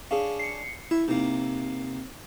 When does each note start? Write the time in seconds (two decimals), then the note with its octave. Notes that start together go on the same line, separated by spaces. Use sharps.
0.11 C#4 D4 G#4 F5
0.39 C7 C#7
0.91 E4 E5
1.08 C3 A#3 D#4